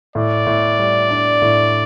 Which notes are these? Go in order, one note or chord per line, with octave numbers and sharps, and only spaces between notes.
A2 D5
A2
G3
D4
A2